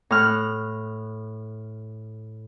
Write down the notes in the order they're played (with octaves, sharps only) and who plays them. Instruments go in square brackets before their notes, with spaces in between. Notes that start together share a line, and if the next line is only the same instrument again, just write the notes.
[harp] A2 F6 F#6